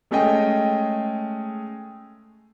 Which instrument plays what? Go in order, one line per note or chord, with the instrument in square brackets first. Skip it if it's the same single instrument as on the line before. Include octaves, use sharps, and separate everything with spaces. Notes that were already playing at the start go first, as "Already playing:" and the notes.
[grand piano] G#3 A3 C#4 G#4 D#5 G5